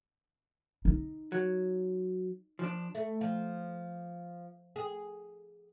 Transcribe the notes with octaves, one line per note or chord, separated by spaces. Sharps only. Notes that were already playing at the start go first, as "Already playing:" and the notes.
D#4
F#3
F3 D4
A3
F3
G#4